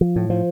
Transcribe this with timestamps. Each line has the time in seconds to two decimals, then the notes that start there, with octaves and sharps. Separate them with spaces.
0.01 F3
0.16 A2
0.30 F3